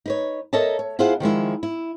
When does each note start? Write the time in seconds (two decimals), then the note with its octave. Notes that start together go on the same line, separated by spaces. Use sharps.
0.06 D#4 B4 C#5
0.53 A4 A#4 C#5 D#5 E5 A5
0.79 C#5
0.99 E4 F4 G#4 C5 F5 F#5
1.20 D#3 F3 G#3 E4
1.63 E4